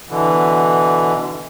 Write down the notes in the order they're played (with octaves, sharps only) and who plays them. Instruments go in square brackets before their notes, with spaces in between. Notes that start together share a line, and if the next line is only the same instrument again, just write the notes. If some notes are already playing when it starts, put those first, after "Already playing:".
[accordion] B2 D3 E3